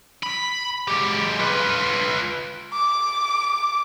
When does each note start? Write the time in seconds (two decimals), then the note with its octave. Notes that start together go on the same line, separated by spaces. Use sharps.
0.23 B5
0.88 G#3 G4
1.39 F4 B4
2.73 D6